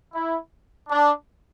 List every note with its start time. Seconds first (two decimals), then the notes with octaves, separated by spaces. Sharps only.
0.13 E4
0.89 D4